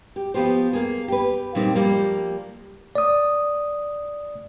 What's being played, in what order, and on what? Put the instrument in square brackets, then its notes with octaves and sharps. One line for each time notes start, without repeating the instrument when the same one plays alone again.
[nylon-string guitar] G4
F3 B3 G4 C5
A#3 G#4
G4 B4
A#2 G3 C4 D#4
F3 G3 A#3
[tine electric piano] D5 D#6